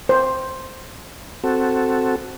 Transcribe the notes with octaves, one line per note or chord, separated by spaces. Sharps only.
C5
C4 F#4 A4